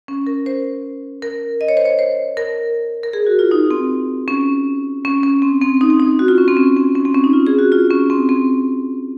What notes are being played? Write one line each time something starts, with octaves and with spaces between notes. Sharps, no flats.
C#4
A#4
C5
A#4
D#5
C#5
C5
C#5
C5
A#4
A#4
G#4
F#4
F4
D#4
C4
C#4
C#4
C#4
C4
C4
D#4
C4
D#4
F#4
F4
C#4
C4
C#4
C4
C#4
C4
C#4
D#4
F4
G#4
F#4
F4
C#4
C4
C4